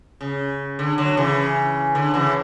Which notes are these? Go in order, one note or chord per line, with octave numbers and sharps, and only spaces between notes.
C#3
D3
D3 F#3
C#3 E3
D3
C#3 E3